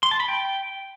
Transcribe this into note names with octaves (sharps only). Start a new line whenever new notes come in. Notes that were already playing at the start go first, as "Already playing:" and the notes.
C6
A5
B5
G5